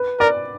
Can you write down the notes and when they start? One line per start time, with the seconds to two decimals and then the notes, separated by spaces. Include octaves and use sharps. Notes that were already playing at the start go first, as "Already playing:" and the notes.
Already playing: B4
0.20 A#4 D5